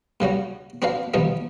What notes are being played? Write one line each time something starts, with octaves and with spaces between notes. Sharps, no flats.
G2 C#3 G3 F#4
C4 D4 F#4 B4 F5
B2 D#3 F3 G3 B3